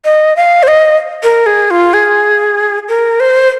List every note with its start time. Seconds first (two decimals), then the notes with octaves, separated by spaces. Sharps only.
0.05 D#5
0.37 F5
0.63 C5
0.68 D#5
1.23 A#4
1.46 G#4
1.71 F4
1.94 G#4
2.88 A#4
3.20 C5